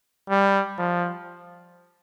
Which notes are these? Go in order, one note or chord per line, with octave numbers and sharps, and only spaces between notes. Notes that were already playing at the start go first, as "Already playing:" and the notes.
G3
F3